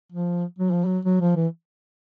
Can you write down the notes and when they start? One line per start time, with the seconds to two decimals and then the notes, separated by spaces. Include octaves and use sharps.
0.12 F3
0.59 F#3
0.72 F3
0.85 F#3
1.05 F#3
1.21 F3
1.36 E3